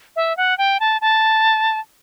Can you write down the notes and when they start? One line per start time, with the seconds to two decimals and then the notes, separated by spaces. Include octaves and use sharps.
0.16 E5
0.37 F#5
0.58 G5
0.80 A5
1.01 A5